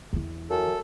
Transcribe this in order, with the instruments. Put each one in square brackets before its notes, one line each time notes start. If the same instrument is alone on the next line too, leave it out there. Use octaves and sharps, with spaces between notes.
[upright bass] E2 E3
[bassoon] F#2 [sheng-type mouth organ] A4